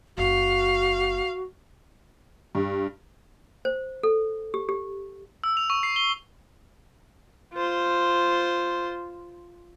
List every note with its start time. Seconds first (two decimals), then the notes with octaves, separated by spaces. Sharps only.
0.18 F#1 F#4 F5
2.55 G2
3.65 C5
4.03 A4
4.54 G4
4.69 G4
5.44 E6
5.57 F7
5.70 C#6
5.83 C7
5.96 G7
7.54 F4 C5